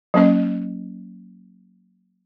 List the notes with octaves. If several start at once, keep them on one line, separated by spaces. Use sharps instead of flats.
F#3 A#3 C#4 D#5